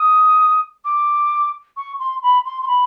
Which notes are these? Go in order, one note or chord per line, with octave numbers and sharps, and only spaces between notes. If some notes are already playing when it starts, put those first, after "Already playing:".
Already playing: D#6
D6
C#6
C6
B5
C6
C6
B5